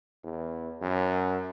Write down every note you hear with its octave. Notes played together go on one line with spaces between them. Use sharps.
E2
F#2